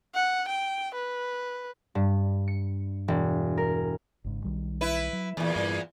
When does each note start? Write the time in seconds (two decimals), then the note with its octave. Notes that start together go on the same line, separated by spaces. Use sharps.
0.14 F#5
0.48 G5
0.94 B4
1.95 G2
2.48 C#7
3.08 E1
3.57 A#4
4.24 G#1 G#2 C#3
4.44 B1 D#3 G3
4.81 E4 B4
5.13 F#3
5.37 E2 A#2 E3
5.56 G2